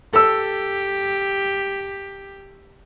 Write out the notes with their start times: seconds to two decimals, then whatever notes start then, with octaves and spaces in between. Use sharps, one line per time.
0.13 G4 A4 E6